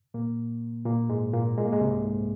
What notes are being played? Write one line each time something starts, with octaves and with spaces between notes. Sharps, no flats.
A#2 A#3
A#2 A#3
G#2 G#3
A#2 A#3
G#3
A#3
G#2 G#3
C2 C3
G#2